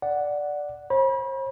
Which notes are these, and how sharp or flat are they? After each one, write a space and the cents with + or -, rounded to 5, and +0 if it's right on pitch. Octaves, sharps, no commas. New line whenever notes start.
D5 +0 F#5 +0
C5 +40 B5 -35